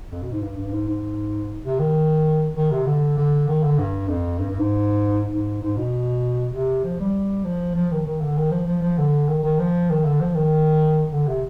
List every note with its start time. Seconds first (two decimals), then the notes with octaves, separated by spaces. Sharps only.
0.12 F2
0.22 B2
0.32 G#2
0.42 G2
0.57 G2
0.67 G2
0.73 G#2
0.87 G#2
1.64 C3
1.79 D#3
2.56 D#3
2.71 C3
2.87 D3
3.18 D3
3.48 D#3
3.63 D3
3.79 G2
4.09 F2
4.39 G2
4.50 G2
4.59 G#2
5.31 G#2
5.62 G#2
5.77 B2
6.53 C3
6.84 F3
7.00 G3
7.44 F3
7.76 F3
7.91 D#3
8.06 D#3
8.21 D3
8.37 D#3
8.51 F3
8.67 F3
8.82 F3
8.98 D3
9.29 D#3
9.43 D#3
9.59 F3
9.90 D#3
10.05 D3
10.20 F3
10.35 D#3
11.12 D3
11.27 C3